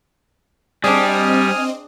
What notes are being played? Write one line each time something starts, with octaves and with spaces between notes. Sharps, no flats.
G3 C4 D4 G#4 D#5 G#5 D#6 F6